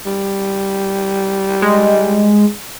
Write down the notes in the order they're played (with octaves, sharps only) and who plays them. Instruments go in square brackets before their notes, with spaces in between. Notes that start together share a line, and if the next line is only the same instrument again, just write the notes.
[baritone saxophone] G3
[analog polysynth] G#3